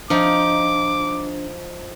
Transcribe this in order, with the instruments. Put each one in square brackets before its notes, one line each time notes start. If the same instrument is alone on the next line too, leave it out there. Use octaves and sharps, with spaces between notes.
[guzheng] F3 D#4 [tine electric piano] D4 [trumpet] D6